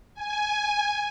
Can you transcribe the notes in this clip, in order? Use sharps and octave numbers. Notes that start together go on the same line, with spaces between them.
G#5